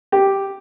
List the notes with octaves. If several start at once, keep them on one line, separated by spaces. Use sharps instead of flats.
G4